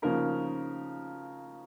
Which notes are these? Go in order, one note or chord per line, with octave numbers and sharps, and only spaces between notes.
C#3 F3 A#3 D#4 A#4